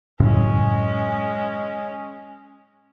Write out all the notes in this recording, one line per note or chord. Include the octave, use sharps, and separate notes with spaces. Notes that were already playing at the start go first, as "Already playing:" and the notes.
F#2 A2 C#3 G#3 C#4